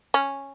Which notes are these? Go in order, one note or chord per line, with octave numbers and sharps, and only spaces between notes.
C#4